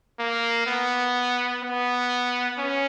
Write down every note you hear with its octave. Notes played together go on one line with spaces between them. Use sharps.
A#3
B3
B3
C#4